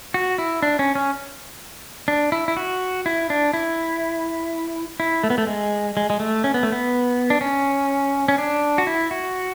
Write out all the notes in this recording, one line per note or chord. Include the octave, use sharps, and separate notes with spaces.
F#4
E4
D4
C#4
C#4
D4
E4
E4
F#4
E4
D4
E4
E4
A3
B3
A3
G#3
G#3
G#3
A3
C#4
B3
A3
B3
D4
C#4
C#4
D4
F#4
E4
F#4